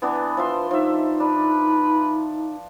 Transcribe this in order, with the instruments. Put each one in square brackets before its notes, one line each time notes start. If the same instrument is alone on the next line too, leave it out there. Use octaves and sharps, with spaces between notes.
[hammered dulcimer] E3 B3 D4
[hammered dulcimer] F3 E5 C6 [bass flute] B4
[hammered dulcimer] F3 E5 [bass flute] D#4
[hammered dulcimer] D4 [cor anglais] B4